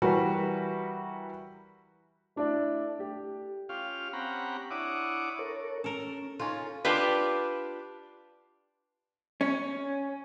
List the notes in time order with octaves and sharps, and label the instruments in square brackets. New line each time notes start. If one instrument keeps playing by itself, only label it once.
[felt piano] E3 G3 F#4 A#4 B4
[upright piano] A3 D4 E4 D5
A3 G4
[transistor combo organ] C#4 F4 G4 F5
C4 C#4 G4 F#5 A#5 B5
D4 E4 C#5 F#5 D6 D#6
[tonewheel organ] A4 A#4 C#5
[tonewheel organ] C#4 [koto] A4 A#4
[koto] C#4 D#4 F4 [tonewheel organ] A4
[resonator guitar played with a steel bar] D4 F4 G4 B4
[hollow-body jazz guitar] C#4